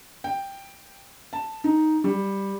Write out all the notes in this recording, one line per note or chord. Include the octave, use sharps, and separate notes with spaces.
G5
A5
D#4
G3